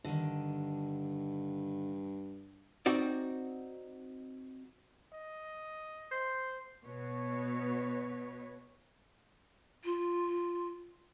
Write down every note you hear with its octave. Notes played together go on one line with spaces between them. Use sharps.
G2 D3 D#3
C4 D#4 F#4 D5
D#5
C5
B2 B4 C#5
F4